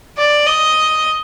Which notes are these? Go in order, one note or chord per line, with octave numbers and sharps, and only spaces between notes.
D5
D#5